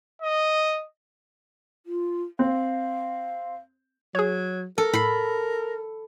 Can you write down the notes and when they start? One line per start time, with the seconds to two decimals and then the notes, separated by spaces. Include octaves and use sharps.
0.22 D#5
1.86 F4
2.39 C4 F5
4.15 F#3 G#4 C#5
4.78 A4 A#4
4.93 A2 B5 C7